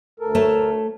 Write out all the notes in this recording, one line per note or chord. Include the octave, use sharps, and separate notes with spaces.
D2 A4 A#4
A3 C#5 A5